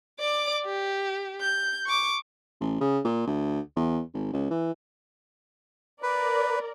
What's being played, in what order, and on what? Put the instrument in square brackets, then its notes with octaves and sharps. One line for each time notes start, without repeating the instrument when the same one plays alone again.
[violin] D5 D6
G4
G6
C#6 D6
[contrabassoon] A1
C#3
A#2
D2
E2
G#1
C#2
E3
[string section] A#4 D5 [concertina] B4